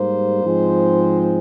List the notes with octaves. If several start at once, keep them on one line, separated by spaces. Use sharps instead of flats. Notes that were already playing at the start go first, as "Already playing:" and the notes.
Already playing: G#2 G3 A#3 C5
G#2 F3 G#3 C4